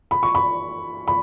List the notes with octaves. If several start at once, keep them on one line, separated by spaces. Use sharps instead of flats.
B5
C#6
B5
B5